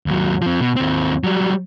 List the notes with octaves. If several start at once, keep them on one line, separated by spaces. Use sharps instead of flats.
D#2 F#3
F3 C4
B2
D#2 C4
F#3 G3